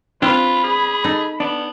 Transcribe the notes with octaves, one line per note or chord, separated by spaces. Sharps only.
C4 D4 F4 B4 B5
G#4
D#4 A4
B3 D4